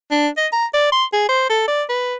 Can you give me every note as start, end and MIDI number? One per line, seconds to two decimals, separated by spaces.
0.11 0.28 62
0.37 0.47 75
0.52 0.65 82
0.74 0.89 74
0.92 1.05 84
1.13 1.24 68
1.29 1.46 72
1.50 1.64 69
1.67 1.83 74
1.89 2.15 71